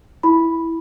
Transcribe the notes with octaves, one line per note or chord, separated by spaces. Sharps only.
E4 B5